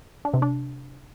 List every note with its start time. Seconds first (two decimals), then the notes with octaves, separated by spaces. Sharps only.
0.25 D4
0.34 C3
0.42 D4